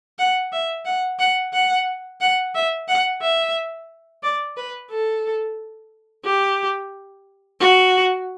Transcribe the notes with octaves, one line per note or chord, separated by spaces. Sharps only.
F#5
E5
F#5
F#5
F#5
F#5
E5
F#5
E5
D5
B4
A4
G4
F#4